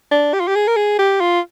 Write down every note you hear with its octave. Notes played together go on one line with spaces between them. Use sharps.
D4
G4
F4
G4
G#4
A#4
G#4
G4
F4